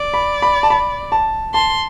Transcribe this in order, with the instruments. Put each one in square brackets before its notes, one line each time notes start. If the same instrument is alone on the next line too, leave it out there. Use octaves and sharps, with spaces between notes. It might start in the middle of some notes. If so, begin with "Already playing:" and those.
Already playing: [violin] D5
[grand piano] B5
B5
A5
B5
A5
[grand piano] A5 [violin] C6